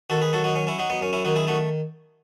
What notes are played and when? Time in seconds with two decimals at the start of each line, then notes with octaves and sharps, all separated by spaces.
0.10 D#3 F#4 A4
0.21 G#4 B4
0.33 F#3 F#4 A4
0.44 D#4 F#4
0.56 F#3 C#4
0.67 C#4 E4
0.78 F#3 D#4 F#4
0.90 B3 D#4
1.01 F#2 C#4
1.13 C#4 E4
1.25 D#3 D#4 F#4
1.36 E4 G#4
1.47 A3 D#4 F#4